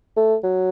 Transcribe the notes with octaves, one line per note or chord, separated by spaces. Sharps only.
A3
F#3